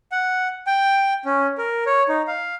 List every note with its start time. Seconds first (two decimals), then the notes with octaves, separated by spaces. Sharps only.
0.12 F#5
0.67 G5
1.25 C#4
1.58 A#4
1.86 C#5
2.08 D#4
2.27 F5